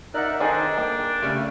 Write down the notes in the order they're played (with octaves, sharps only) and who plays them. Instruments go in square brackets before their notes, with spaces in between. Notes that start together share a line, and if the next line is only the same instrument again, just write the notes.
[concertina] D#4 A#4 F#6 [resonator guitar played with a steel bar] D5 F#5 [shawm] E5
[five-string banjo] D#3 G#5 [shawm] D4 [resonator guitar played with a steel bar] G#4 A4 D#5 [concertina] C5
[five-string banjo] A#3 [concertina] G5
[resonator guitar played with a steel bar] C#3 G3 A3